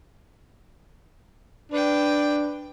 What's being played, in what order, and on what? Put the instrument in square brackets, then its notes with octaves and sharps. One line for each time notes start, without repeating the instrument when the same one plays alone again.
[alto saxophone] D4 [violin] B4 G5